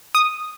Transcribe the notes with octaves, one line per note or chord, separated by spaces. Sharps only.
D#6